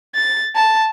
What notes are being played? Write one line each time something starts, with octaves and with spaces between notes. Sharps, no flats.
A6
A5